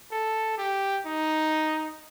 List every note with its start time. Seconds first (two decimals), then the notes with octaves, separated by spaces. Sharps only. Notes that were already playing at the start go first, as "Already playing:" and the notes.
0.11 A4
0.58 G4
1.06 D#4